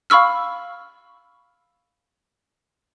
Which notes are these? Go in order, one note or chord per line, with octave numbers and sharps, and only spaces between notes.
F5 B5 C#6 E6 F6